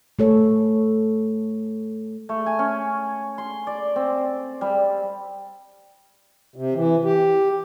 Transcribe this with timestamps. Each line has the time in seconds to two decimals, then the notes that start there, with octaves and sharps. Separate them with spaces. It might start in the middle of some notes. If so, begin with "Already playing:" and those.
0.19 A3 A4 C#5
2.29 A3
2.46 G#5
2.59 C#4
3.38 C6
3.67 D5
3.96 C4
4.61 G3
6.56 C3
6.74 E3
7.04 G4